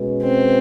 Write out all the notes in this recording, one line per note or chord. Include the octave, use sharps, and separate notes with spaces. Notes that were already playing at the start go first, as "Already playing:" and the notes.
Already playing: B2 G#3 C#4 F#4 B4
C4